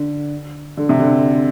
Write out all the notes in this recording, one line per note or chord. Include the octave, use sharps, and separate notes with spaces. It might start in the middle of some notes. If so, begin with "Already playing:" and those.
Already playing: D3
D3
C3
D3